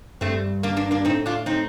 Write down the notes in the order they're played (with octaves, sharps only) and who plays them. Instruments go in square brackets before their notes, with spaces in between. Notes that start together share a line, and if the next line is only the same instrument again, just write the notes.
[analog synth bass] G2 [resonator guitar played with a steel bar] A3 C4
[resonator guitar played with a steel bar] A#3 D4
A#3 D4
A#3 D4
[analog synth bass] A2 [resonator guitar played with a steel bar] C4 D#4
[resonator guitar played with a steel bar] D4 F4
C4 D#4